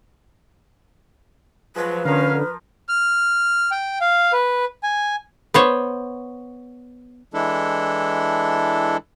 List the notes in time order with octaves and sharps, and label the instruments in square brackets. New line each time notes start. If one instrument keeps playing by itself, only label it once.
[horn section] F3 F#3 [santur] G#3 [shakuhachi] B4
[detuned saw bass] D3 [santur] F3 A#4 [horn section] C#4 F5
[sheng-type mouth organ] F6
G5
F5
B4
G#5
[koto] B3 C5 C#5
[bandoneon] E3 G#3 D4 E4 A4